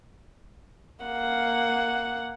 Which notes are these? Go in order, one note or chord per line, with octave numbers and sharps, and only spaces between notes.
A#3 F#5